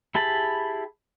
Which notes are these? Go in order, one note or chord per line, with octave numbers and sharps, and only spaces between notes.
E4 G4 G#4 A5 B5